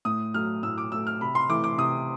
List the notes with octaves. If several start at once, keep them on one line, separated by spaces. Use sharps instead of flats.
A2 D#6
F#3 A3 F6
A2 E6
D6
F#3 A3 E6
F6
C3 B5
C6
E3 A3 D6
D6
C3 D#6